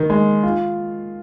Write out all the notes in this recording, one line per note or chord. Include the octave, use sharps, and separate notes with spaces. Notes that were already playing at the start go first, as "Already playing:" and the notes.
Already playing: D#3
G#3
F4